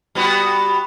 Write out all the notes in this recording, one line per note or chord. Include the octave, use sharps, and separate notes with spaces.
G3 B3 F#4